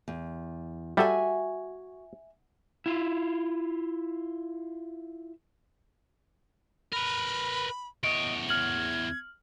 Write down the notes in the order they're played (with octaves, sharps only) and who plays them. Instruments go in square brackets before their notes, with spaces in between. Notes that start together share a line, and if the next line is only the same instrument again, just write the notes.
[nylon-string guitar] E2
[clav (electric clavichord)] G3 A4 [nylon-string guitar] F#4 [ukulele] E5 G#5
[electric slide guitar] E4 F4
[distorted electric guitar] A#4 B4 [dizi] B5
[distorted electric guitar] E2 C#5 [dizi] D#5 [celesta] D7
[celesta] F6 F#7 [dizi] G#6